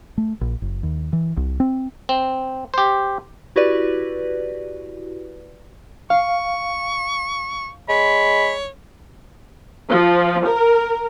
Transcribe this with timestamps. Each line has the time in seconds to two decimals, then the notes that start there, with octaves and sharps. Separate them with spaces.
0.18 A3
0.41 A#1
0.62 F#1
0.83 D#2
1.13 E3
1.37 C2
1.60 C4
2.09 C4
2.74 G4 C5
3.56 E4 F#4 G4 B4 D5
6.10 F5 C#6
7.89 G#3 C#5 B5
9.89 F3
10.46 A#4